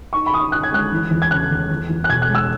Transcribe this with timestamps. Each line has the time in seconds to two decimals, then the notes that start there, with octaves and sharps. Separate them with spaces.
0.12 D#4 C#6
0.26 B5
0.33 D#4 D#6
0.39 C#6
0.52 D#4 F#6
0.63 G#6
0.72 G#3 F#6
0.92 E3
1.10 E2
1.22 G#6
1.31 C#3 F#6
1.51 E2
1.70 E2
1.89 E2
2.04 F#6
2.09 B2 G#6
2.22 F#6
2.28 G#3
2.35 E6